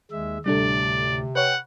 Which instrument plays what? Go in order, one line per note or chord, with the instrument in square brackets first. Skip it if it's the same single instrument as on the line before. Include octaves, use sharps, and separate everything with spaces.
[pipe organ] D#2 G#3 E5
[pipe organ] D2 A2 [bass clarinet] C3 [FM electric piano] G3 D4 A4 [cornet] D5
[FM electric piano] B4 C#5 [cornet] F#5 [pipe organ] G5